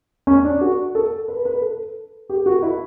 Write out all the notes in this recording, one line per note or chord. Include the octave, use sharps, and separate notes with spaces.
C#4
D4
F#4
A4
B4
B4
A4
G4
F#4
E4